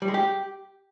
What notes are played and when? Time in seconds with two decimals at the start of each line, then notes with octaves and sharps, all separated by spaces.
0.02 G3
0.08 G#3
0.14 G4